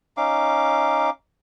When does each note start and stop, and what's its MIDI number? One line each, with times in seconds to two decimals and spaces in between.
0.17 1.10 61
0.17 1.10 63
0.17 1.10 77
0.17 1.10 86